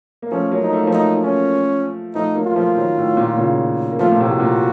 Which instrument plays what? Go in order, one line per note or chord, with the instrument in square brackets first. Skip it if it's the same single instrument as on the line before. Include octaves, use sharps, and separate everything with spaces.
[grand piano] A#3
[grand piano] F3 A3 [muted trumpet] C#4
[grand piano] F#3 A#3
[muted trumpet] D#4
[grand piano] A3
A#3
F3 A3
[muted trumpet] D#4
C#4
[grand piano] F3 A3 [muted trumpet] D#4
[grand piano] F#3 A#3
[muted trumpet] F4
[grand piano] F3 A3
D#3 F#3
A2
A#2
A#2 C#3
A#3
[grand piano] F3 A3 [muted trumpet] F4
[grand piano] A#2
A2 C3
[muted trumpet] F#4
[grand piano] A#2